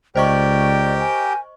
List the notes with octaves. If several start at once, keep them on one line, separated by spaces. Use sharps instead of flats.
C#2 G4 A#4 C5 D5 D#5 G5 C#6
G#5